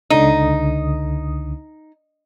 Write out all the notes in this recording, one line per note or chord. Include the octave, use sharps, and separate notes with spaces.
C#2 D3 D#4 D#6